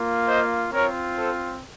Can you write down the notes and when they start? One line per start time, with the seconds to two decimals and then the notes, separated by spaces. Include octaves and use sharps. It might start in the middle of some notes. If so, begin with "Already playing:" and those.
Already playing: A#3 F4
0.27 C5 D#5
0.72 C4 F4 A#4 C#5
1.17 A4 C5